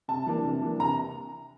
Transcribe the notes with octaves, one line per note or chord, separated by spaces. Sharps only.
C3 A5
E3 A#3 D4
C3
E3 A#3 D4
C3 A#5